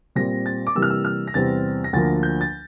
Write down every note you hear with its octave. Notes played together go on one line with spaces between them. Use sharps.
A#2 G3 C4 A#6
A6
D6
C3 E3 G3 A#3 E6
F6
E6
F6
A#6
E2 C3 G3 C4 A6
A#6
D2 D3 F3 A#3 A6
G6
A6